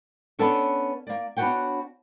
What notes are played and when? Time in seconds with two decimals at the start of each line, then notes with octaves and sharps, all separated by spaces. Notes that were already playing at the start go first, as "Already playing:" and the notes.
0.39 B3 C#4 D4 A4 B4 C#5
1.07 A#3 D5
1.37 B3 D4 F#4 C#5 F#5 G5